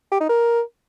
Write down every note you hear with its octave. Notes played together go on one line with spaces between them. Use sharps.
G4
D#4
A#4